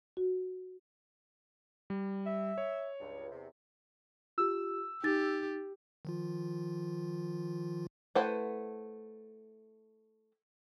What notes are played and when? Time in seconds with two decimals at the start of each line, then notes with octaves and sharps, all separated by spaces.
0.17 F#4
1.90 G3
2.26 E5
2.58 C#5
3.00 C#2 G2
3.32 E2 C3
4.38 F4 G4 E6
5.04 D#4 G4 A6
6.05 D#3 F3 F4
8.15 A3 E4 B4 C5 F#5